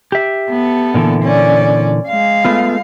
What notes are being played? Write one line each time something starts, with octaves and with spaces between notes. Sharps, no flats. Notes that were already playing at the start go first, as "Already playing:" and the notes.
G4 E5
B3 A4
A#2 D3 E3
C#4 D5
G#3 F5
A3 B3 F4